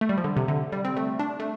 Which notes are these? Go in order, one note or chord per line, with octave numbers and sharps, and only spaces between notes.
A3
G3
F3
D3
C3
D3
G3
C4
A3
D4
A3